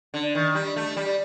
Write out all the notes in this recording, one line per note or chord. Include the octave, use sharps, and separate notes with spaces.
D3
D#3
G3
A3
G3